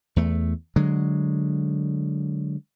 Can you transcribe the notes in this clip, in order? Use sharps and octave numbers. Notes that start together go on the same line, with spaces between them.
E2 A3
D3 F#3 G#3